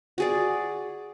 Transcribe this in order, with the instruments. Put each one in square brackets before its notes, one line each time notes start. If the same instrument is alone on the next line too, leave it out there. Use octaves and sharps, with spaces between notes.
[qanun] F#4 G#4 D5